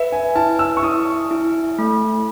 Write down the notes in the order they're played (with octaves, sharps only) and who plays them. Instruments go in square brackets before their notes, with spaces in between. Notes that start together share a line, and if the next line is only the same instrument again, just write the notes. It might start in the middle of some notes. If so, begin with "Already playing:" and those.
Already playing: [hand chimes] B4 [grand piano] E5
[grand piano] G#5
[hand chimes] E4 [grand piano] A5
[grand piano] E6
C#6
[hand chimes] E4 [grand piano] D#6
[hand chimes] E4
A3